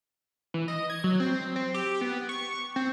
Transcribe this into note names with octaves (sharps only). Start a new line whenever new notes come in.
E3
D#5
G#6
F#3
C4
C4
G4
B3
C#6
C4